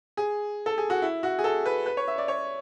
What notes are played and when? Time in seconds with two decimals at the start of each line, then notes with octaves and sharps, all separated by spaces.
0.17 G#4
0.66 A4
0.78 G#4
0.90 F#4
1.02 E4
1.23 F#4
1.39 G#4
1.44 A4
1.66 B4
1.86 B4
1.97 C#5
2.08 E5
2.18 D5
2.28 C#5